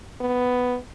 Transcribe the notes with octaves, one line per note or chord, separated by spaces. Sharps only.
B3